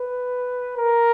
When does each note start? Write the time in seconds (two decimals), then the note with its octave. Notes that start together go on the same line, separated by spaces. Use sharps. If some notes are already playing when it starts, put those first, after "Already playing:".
Already playing: B4
0.78 A#4